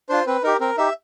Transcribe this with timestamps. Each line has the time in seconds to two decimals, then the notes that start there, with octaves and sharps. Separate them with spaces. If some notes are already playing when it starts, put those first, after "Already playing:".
0.09 D4 F4 C5
0.27 C4 B4
0.43 D#4 G4 A#4
0.60 C4 A#4
0.77 D#4 G4 E5